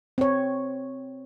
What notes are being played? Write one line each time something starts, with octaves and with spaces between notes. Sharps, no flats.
C4 C#5